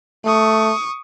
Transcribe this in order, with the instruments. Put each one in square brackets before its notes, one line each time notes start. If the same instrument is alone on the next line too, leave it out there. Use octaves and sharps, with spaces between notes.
[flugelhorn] A3 [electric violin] C#6 D#6